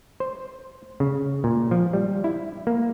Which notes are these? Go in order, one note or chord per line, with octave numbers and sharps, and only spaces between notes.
C5
C#3
A#2
F3
G3
E4
A#3